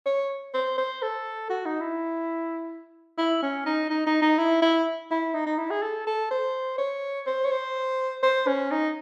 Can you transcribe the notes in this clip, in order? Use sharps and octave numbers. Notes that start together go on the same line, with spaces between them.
C#5
C5
C5
A4
F#4
D#4
E4
E4
C#4
D#4
D#4
D#4
D#4
E4
E4
E4
D#4
D#4
E4
G#4
A4
A4
C5
C#5
C5
C#5
C5
C5
C#4
D#4